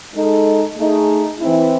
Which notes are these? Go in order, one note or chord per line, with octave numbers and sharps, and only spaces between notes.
G#3 D#4 A4
A3 D#4 G#4
E3 C4 E4